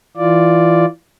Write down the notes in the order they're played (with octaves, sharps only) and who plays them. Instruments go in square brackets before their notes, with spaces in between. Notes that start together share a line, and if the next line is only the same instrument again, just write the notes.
[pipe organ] E3 F4 D5